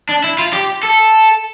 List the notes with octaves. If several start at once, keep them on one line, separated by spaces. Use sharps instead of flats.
D4
E4
F4
G4
A4